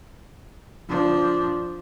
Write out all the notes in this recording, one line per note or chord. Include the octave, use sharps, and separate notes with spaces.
F3 D4